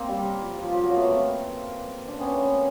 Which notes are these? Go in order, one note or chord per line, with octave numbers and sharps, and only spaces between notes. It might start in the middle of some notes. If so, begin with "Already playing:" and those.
Already playing: A#3 C4
G3
F3
F3
F3
F#3
A3 B3
A#3 C4
C4 D4
B3 C#4
A3 B3
A#3 C4